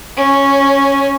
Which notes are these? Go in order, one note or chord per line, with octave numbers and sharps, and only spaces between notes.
C#4